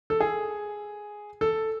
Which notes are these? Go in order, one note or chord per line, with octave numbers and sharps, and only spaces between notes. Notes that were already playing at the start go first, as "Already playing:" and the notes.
A4
G#4
A4